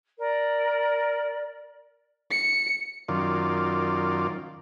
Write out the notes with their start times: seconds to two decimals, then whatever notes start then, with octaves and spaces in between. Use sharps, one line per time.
0.18 A#4 D5
2.31 C#7
3.09 F#2 D#3 F4 D5